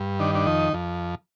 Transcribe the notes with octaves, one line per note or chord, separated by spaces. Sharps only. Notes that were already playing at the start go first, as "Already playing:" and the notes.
Already playing: G2
D#3 D4
D4
F2 D#4
F2